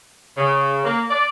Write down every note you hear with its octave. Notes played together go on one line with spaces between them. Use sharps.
C#3
A#3
D5